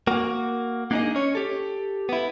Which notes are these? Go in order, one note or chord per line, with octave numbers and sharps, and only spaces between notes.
A#3 F#4
A#3 D4 D#4 G4 G#4 D#5
C#4 C#5
G4 A4
B3 E4